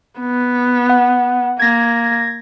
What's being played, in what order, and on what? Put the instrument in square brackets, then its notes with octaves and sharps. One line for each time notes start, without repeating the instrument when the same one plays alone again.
[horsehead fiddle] B3
[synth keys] F#5
[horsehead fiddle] A#3 [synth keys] G#6 A#6